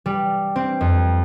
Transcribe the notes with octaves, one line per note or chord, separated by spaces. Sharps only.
G3
C4
F2